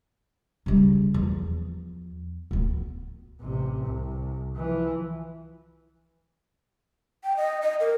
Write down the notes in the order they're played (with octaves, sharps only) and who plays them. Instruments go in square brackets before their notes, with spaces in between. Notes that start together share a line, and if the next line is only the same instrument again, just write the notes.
[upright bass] C#3 G3
E2 F3
D1 B3
[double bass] A1 C3
C2
E3 F3
[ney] G5
D#5
D#5
A#4